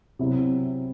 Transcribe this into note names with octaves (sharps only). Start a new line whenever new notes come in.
C3 F#3 C4 E4